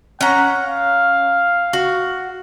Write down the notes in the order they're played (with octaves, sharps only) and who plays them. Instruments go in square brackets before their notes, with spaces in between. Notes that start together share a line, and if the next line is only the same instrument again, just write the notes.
[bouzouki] C#4 A#5 [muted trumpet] F#5
[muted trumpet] F5
[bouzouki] F#4